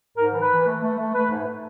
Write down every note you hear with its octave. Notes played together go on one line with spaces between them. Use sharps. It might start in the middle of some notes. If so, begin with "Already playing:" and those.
G#2 A#4
E3
B4
E3
A3
A3
A3
A3 B4
G#2
A3